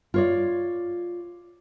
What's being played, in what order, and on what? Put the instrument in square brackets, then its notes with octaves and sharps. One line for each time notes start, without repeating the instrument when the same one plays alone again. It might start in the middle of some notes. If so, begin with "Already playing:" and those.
[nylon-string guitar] F4 C#5 D5